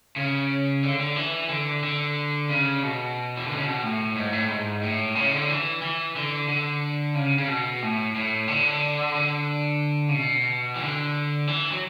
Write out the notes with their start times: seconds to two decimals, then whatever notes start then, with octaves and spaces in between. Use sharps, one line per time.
0.16 C#3
0.83 D3
1.00 D3
1.16 E3
1.49 D3
1.83 D3
2.49 C#3
2.83 B2
3.37 E3
3.46 D3
3.57 C#3
3.65 B2
3.83 A2
4.16 G#2
4.33 A2
4.49 G#2
4.83 A2
5.15 C#3
5.33 D3
5.49 E3
5.82 E3
6.16 D3
6.48 D3
7.15 C#3
7.38 C#3
7.48 B2
7.82 A2
8.15 A2
8.48 D3
9.15 D3
10.09 C#3
10.14 B2
10.76 E3
10.81 D3
11.47 E3
11.72 F#3